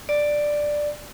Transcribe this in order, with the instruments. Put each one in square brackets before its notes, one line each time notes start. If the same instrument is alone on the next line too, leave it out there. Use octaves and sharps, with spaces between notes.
[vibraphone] D5